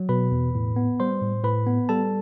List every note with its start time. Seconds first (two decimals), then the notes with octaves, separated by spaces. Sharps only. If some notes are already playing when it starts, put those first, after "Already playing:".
Already playing: F#3
0.09 B2 B4 B5
0.31 E2
0.55 A2
0.76 B3
1.00 G3 C5 C6
1.22 A2
1.44 A2 B4 B5
1.66 B3
1.89 G3 A4 A5